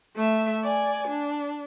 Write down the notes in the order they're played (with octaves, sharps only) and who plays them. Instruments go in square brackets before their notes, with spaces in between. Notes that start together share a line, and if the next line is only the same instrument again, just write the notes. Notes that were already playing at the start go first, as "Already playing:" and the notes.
[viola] A3 E5
D5 G#5
D4